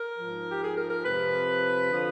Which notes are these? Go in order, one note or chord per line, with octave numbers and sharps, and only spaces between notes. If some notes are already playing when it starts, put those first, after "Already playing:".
Already playing: A#4
G#2 F3
G4
G#4
A#4
A#4
F2 C3 F3 B4
D3 F3